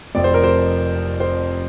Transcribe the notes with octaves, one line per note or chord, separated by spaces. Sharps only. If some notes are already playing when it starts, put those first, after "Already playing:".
F1 F2 F3 C4 D5
C5
A#4
C5
C5